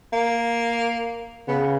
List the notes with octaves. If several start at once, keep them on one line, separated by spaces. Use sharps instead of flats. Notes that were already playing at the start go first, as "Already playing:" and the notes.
A#3
C#3 B3